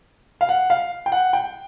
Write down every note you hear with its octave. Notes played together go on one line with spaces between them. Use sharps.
F5
F#5
F5
G5
F#5
G5